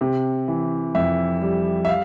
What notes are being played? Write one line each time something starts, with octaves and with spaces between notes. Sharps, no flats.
C3
E3
F2 E5
G3
E5
F5